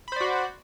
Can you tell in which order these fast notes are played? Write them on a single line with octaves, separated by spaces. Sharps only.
B5 C5 D5 F#4